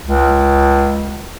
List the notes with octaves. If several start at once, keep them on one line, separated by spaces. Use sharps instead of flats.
C#2